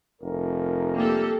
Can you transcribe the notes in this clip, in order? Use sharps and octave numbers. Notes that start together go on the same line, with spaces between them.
F1 A#4
G3 A#3 G4 A4